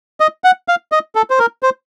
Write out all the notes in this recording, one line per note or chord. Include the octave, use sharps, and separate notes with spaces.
D#5
F#5
F5
D#5
A4
C5
A#4
C5